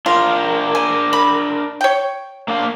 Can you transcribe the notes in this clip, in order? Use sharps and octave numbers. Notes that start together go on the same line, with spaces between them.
D4 F4 A#4
G#5
B5
C#5 G5
A#3 D4 F5